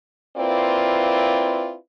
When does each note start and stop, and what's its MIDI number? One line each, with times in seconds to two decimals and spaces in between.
0.36 1.75 58
0.36 1.75 60
0.36 1.75 64
0.36 1.75 65
0.36 1.75 71
0.36 1.75 74